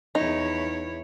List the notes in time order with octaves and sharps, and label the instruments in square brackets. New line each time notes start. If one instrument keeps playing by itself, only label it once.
[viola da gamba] E2 E4 C#5 [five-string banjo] D#4